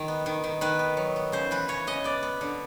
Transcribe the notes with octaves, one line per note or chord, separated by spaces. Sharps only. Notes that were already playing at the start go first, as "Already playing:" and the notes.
Already playing: D#3
B3
D#3
D#3
D#3 B4
B3
F#3
B3
C#3 C5
E3 B4
C#3 C#5
C#3 D#5
B3 D5
B3
D3